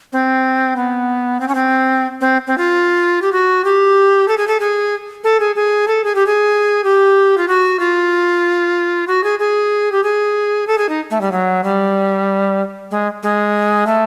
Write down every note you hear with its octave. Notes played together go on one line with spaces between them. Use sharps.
C4
B3
C4
C#4
C4
C4
C4
F4
G4
F#4
G4
A4
G#4
A4
G#4
A4
G#4
G#4
A4
G#4
G4
G#4
G4
F4
F#4
F4
F#4
G#4
G#4
G4
G#4
A4
G#4
D#4
A3
G3
F#3
G3
G#3
G#3
A3